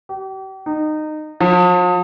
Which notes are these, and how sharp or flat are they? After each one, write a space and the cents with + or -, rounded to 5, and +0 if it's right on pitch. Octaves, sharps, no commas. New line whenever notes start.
G4 -40
D#4 -20
F3 +45